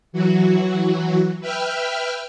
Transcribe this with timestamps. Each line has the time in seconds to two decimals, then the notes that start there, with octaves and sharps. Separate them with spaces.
0.12 E3 F#3 F#4
1.41 B4 E5 G5 F6